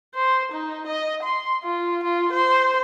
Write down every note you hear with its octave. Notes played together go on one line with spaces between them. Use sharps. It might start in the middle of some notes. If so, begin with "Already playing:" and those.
C5
D#4
D#5
C6
F4
F4
C5